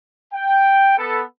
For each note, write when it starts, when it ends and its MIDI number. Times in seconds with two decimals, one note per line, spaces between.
0.34 0.96 79
0.98 1.22 59
0.98 1.22 69